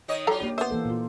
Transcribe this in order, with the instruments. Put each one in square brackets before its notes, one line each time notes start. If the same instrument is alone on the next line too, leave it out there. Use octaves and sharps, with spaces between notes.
[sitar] D#3 C#5 D#5
[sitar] F#3 F4 [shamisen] A4 F5 A#5
[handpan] A#3 D4 G4
[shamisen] B3 E5 [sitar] C5
[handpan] E3 A#3 A4
A#2 F4